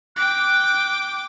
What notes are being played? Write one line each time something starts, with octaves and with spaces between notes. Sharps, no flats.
G5 D6 F#6